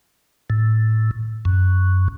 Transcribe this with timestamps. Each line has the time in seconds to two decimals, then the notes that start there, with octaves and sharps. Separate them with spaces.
0.50 A2
1.45 F#2